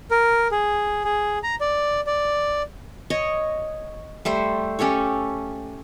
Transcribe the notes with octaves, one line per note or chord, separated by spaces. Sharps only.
A#4
G#4
G#4
A#5
D5
D5
C#5 D#5
G3 A3 C5
C#4 G4 A4 C#5